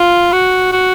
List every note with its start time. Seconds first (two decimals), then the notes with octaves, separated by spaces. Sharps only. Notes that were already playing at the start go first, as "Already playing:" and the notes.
Already playing: F4
0.32 F#4
0.72 F#4